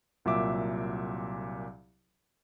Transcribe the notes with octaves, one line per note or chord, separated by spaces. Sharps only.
C2 A#2 F#3 E5 D6